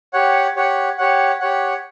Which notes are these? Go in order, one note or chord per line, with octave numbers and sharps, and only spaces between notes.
G4 C#5 F#5
G4 C#5 F#5
G4 C#5 F#5
G4 C#5 F#5